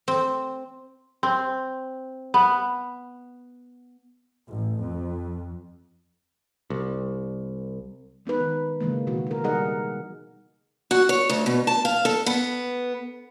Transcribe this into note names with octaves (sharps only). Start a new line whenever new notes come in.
C4
C4
B3
A1
F2
C2
G#3 B3 D#4 B4
D#3
C#3 E3 G#3 A#3
B2 D#3 E3 F#4
F#4 A#4
G3 D#4 G#4 A#4 D#5 F#5
F#4
C#5
D2
B2
A5
F5
A4
B3